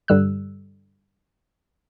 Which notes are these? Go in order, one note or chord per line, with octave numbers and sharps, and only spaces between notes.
G2 D3 G3 E6 F#6